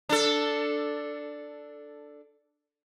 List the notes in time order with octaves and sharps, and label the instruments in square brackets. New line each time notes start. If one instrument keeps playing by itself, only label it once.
[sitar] D4 A4